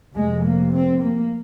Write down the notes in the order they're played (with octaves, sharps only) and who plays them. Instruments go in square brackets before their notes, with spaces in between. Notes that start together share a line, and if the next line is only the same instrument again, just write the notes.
[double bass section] F1 F2 C3 G#3
A#3
C4
A#3